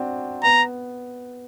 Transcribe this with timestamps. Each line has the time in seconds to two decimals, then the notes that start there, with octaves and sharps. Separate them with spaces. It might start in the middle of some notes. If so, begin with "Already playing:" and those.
Already playing: C4 D4 F#4
0.43 B3 A#5